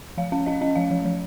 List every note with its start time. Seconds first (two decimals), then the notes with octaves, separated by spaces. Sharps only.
0.18 F3 F5
0.32 C#4 F5
0.46 C#4 D#5
0.61 C#4 D#5
0.76 F3 F5
0.91 F3
1.05 F3